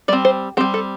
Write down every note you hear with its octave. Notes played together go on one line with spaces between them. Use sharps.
G3 C4 D5
C5
G3 C4 G4
A4